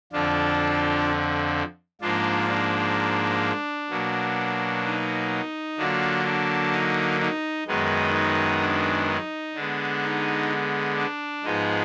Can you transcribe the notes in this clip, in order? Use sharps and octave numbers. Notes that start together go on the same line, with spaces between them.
F2 D3 F3 D4 F4
G#2 F3 A#3 D4 F4
D4
B2 F#3 A#3
D#4
D3 F#3 A#3 D4 F4
D4
D#4
D#4
F#2 D#3 G#3 B3 D#4
D#4
D4
D#4
D3 G#3 B3 D4
D#4
D4
G#2 F3 G#3 B3 D#4